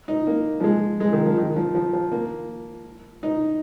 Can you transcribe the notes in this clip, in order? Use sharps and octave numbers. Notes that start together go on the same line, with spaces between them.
D#4
A#3
F3
G#3
G#3
D#3
F3
D#3
F3
F3
F3
A#3
D#4